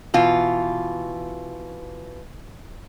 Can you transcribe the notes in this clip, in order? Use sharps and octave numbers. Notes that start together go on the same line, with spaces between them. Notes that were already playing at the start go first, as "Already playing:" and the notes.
B2 E3 F4